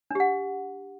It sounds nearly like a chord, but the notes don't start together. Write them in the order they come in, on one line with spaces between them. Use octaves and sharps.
D4 G4 F#5